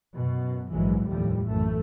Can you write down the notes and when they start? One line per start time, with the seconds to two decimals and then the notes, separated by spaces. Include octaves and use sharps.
0.14 F#2 B2
0.71 A#1 G#2 E3 F#3 G#3
1.07 F1 D#2 A2 F3 G3
1.47 A#1 F#2 E3 A3